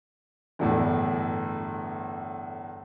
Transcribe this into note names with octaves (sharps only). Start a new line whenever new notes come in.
G1 E2 A2